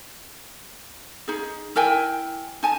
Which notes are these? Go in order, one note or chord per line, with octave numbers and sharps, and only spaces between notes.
D#4 G#4
E4 A#4 G5 G#5
D#4 G#5 A5